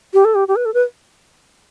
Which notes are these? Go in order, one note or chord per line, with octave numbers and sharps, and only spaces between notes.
G4
A4
G4
G4
B4
A4
B4